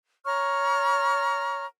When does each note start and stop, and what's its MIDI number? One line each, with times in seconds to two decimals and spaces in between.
0.25 1.65 73
0.25 1.65 82
0.25 1.65 85
0.25 1.65 89